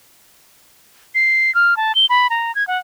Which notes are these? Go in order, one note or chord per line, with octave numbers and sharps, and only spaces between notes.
C7
F6
A5
G7
B5
A#5
G#6
F#5